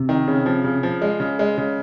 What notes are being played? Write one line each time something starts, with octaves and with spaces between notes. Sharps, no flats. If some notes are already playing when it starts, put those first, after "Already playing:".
Already playing: C3
D#3
C#3
F3
C#3
F3
G#3
C#3
G#3
C#3